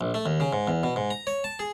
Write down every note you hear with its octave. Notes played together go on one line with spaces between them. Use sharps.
A#1
A3
D#2
C#3
G#2
E2
B2
G#2
A#5
C#5
A5
G#4